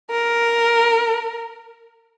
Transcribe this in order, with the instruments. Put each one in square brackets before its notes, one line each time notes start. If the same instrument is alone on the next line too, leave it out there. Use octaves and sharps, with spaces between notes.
[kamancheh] A#4